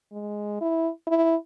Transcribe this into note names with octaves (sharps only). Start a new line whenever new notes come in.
G#3
E4
E4